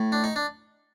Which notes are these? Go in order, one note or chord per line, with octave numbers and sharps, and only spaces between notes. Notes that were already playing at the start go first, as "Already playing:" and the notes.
Already playing: A2
D4
D#4
D4